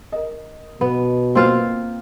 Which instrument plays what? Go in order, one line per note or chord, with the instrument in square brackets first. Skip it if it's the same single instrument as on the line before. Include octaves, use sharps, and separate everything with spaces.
[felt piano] A#4 D#5
[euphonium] B2 [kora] B3
[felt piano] A#3 C5 G5 [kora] C4 F4 F5